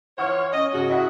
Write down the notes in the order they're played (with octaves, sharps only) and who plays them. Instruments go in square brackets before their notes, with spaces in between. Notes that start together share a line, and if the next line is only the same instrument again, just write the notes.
[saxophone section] E3 F4 C#5 [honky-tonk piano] F#5 C#6 F6
[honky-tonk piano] C#4 [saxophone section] D#5
[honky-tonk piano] G#2 C#3 [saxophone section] F#4
[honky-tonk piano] E4 D#5 F#5